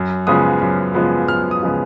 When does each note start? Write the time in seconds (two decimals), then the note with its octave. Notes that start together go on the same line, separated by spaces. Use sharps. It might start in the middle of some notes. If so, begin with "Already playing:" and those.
Already playing: F#2
0.27 C#3 F3 G#3 B3 D#6
0.61 F#2
0.94 C#3 F3 G#3 B3
1.28 F#2 F6
1.51 D#6
1.63 C#3 F3 G#3 B3